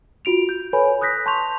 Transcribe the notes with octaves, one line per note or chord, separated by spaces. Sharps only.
F4 F#4 D7 F7
G6
A4 B4 C#5 G#5 B5
D#6 F#6 G6 A#6 B6
A5 C6 C#6 G6 F7